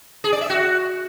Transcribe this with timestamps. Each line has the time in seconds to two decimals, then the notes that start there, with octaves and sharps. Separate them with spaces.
0.24 G#4
0.33 D5
0.41 E5
0.50 F#4